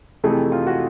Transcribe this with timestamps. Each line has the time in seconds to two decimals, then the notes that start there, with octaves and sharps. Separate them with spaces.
0.24 F2 C3 E3 A3 G#4
0.52 F4
0.67 F#4